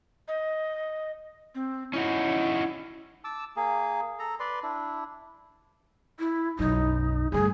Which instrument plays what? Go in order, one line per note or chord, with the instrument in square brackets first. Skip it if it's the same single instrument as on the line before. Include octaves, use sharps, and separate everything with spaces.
[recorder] D#5
C4
[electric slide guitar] C#4 D#4 F#4 [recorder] E4
[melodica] A5 D6 E6
A#3 G#4
A4 A#5
B4 D5 C6
D4 E4
[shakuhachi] E4
[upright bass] B1 F#2 [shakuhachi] D#4
[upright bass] D2 G2 [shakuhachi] G#4